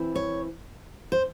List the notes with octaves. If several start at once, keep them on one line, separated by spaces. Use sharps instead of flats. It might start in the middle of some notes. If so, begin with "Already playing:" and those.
Already playing: E3 C4 E4
C#5
C5